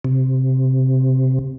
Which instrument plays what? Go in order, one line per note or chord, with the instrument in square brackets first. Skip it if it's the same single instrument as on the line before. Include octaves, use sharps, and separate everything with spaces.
[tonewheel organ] C3